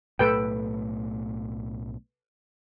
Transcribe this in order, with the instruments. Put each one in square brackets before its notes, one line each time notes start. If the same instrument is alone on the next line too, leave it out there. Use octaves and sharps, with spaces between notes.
[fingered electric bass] B1 A2 A3 [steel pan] A4 B4 G5